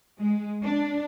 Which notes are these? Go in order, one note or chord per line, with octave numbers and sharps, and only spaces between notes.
G#3
D4